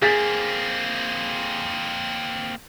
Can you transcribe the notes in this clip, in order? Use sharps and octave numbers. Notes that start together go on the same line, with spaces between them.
A#3 C4 G#4 A6 B6